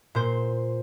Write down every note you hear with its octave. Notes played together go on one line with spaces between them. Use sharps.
A#2 C5